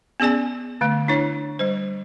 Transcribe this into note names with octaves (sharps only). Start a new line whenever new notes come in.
B3 C#4 G#4 D5 G#5
D3 A3
D4 E4 C#5
G3 C5